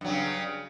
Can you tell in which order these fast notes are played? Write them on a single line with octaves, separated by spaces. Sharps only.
G2 F#3 C#3